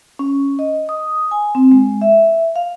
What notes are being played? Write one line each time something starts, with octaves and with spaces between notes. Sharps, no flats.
C#4
D#5
D#6
G#5
C4
G#3
E5
F5